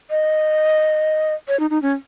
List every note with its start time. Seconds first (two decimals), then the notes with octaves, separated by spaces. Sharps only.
0.10 D#5
1.48 C#5
1.60 D#4
1.70 D#4
1.82 C#4